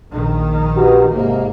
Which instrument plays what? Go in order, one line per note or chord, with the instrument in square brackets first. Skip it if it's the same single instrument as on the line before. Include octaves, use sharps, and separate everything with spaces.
[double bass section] A#1 D#3
[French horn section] F#4 G4 B4
[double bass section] G#1 A#3 [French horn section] G#2 C3